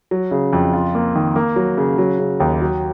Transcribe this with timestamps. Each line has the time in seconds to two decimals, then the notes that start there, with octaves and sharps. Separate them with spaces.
0.11 F#3
0.31 C#3
0.53 F2
0.73 F4
0.95 A#3
1.15 D#3
1.36 A#3
1.56 F#3
1.77 C#3
1.98 F#3
2.19 C#3
2.40 D#2
2.61 F#3